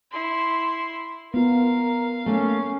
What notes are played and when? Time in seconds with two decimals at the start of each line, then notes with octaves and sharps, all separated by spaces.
0.11 E4 C6
1.34 B3 F4 A#4 F5
2.26 A3 A#3 C#4